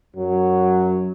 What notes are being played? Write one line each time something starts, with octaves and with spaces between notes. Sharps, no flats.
F#2 F#3